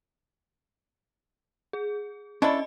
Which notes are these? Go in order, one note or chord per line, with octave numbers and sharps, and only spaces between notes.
G#4
C#4 D4 E4 A4 D5 D#5 A5 B5